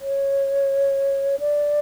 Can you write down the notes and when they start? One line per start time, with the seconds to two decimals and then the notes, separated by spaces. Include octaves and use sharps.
0.01 C#5
1.39 D5